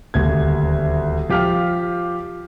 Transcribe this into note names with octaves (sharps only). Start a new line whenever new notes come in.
D#1 D2 G#6
F3 G4 F5 F6